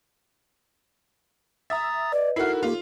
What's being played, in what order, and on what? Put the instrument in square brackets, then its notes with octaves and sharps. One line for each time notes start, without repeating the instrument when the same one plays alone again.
[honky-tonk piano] E5 [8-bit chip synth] A#5 D#6 A6
[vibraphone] B4 D#5 [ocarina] D5
[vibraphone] D#4 A4 C5 [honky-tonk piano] E4 F#4 [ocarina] A#4 [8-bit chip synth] F6 C7
[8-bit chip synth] A#3 G4 [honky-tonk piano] F4